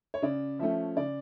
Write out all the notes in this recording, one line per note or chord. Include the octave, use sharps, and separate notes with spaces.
C#5
C#3 D5
F3 A3 C#4 E5
C#3 D5